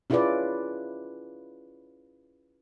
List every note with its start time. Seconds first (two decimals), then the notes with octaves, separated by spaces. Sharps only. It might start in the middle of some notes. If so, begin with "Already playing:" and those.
0.10 C#4 E4 F4 G#4 B4 D5